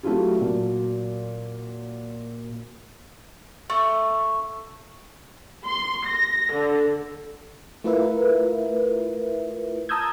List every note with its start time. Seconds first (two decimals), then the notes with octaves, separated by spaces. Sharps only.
0.03 F#3 A3 E4 F4 G4
0.39 A#2 F#3
3.70 A3
5.67 C6
6.08 A#6
6.53 D3
7.84 A3 E4 F4 A#4 B4 E5
9.89 A5 A#5 D#6 E6 G6 G#6